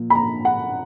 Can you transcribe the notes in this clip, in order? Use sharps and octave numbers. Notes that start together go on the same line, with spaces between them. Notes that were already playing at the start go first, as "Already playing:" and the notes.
Already playing: A#2 F3
B5
A#5
F#5